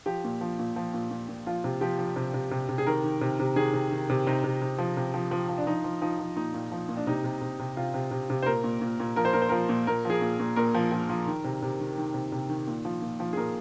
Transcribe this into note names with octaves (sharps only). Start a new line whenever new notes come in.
F3 G4
A#2
F3
A#2
F3
A#2
A#2
A#2
F3 F4
C3
F3 G4
F3
C3
C3
C3
C3
G#4
D#3 A#4
D#3
C3
C3
D#3 G#4
C3
D#3
C3
C3 D#4
C3
C3
F3
C3
F3
F3
F3
D4
F3 D#4
F3
F3 D#4
F3
A#2 D#4
A#2
F3
A#2
D4
C3 D#4
C3
C3
C3
C3 F4
C3
C3
C3
C5
A#2 A#4
A#2
A#2
A#2
F3 A#4
C5
A#2 A#4
C5
F3 A#4
A#2
A#2 A#4
F3 G#4
A#2
A#2
A#2 A#4
F3
F3
F3
D#3
C3
C3
D#3
D#3
C3
C3
D#3
A#2
F3
A#2
F3
G#4
A#2 A#4